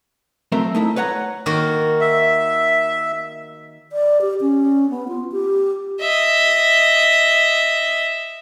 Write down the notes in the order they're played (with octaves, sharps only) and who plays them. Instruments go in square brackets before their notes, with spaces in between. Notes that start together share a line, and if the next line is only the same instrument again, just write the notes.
[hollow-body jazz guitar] F#3 A3 C4 A#4 C5 E5
A3 D#4 E4
B4 C#5 F#5 A#5
[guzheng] D#3 A#3 F#4
[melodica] E5
[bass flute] D5
G4
C#4
B3
F4
G4
[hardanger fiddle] D#5 E5